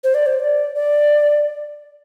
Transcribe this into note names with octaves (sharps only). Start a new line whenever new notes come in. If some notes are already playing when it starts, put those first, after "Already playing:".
C5
D5
C5
D5
D5